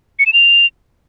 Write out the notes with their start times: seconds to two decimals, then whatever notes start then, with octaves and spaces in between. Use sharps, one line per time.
0.19 C#7
0.26 E7
0.33 F7